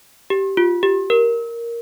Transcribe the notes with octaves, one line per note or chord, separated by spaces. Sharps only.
G4
F4
G4
A#4